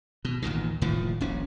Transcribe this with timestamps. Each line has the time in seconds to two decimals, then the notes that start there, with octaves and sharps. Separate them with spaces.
0.25 B2
0.42 A1 D#2 A#2 D#3
0.82 D#1 A2 D#3 F3
1.21 D#1 A#1 C#4